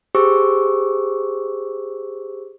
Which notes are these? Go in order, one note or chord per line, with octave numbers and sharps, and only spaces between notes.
G4 G#4 C5 C#6 D6 E6